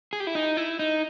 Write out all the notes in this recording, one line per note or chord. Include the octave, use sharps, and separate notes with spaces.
G#4
G4
E4
D#4
E4
D#4